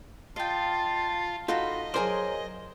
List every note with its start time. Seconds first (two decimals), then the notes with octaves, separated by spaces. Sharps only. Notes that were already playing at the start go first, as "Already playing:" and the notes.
0.36 F4 D#5 F5 G5 A5
1.48 D#4 F4 F#4 A4 D#5 B5
1.94 F#3 G#4 A#4 C5 D5 G#5